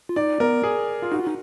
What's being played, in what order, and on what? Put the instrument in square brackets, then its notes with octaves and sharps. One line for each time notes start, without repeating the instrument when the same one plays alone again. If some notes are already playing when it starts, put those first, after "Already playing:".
[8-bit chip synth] F4
[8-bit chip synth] D#4 [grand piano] D5
[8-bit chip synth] B3 [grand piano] A#4
[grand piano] G#4
F4
[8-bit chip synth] D#4 [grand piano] F#4
[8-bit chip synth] F4
D#4